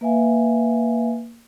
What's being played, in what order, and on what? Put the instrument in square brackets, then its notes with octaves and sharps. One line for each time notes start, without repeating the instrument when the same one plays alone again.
[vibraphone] A#3 B4 E5 F5 G#5